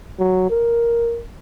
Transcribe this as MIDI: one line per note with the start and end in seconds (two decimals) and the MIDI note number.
0.19 0.46 54
0.50 1.21 70